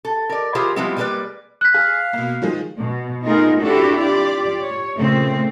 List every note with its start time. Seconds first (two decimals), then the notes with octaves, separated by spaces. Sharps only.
0.05 A4
0.29 A#4 D5
0.55 E3 F4 G4 G#4 A#4 C5
0.76 E3 F3 G3 G#3 B3 C4
0.96 G3 G#3 A#3 B3 B4 D5
1.61 F#6 B6
1.74 G#4 F5
2.13 B2 A#3
2.42 D#3 F3 G#3
2.79 B2
3.24 A3 B3 D#4 F4 G#4 A#4
3.61 C4 D4 E4 F#4 G4 A4
3.99 F4 G4 D5
4.63 C#5
4.96 A#2 C#3 A3 C4